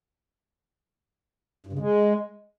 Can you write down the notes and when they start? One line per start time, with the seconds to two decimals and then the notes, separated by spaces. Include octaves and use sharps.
1.66 G2
1.73 C#3
1.79 G#3